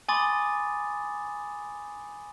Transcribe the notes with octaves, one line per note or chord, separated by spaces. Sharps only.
G#5 B5 C6 D6 D#6 A6